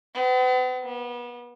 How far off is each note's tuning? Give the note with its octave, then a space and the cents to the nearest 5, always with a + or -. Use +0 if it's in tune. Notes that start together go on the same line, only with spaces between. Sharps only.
B3 +45
B3 -30